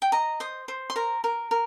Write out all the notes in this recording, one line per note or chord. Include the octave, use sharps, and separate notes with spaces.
G5
D#5 A#5
C5 D#6
C5
C6
A#4 A#5
A#4
A#4